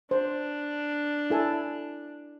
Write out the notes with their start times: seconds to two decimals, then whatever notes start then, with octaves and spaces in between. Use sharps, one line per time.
0.11 D4 C5
1.30 E4 A4 G#5